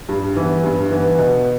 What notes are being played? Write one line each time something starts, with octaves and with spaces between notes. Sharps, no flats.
G2
E3 B3
G2
E3 B3
B2